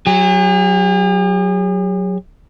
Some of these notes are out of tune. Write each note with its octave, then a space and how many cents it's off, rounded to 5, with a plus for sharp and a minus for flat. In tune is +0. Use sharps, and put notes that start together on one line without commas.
F#3 +5 G#4 -45